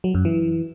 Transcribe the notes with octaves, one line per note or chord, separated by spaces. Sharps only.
F#3
F#2
E3